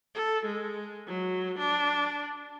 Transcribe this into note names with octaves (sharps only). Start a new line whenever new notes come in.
A4
G#3
F#3
D4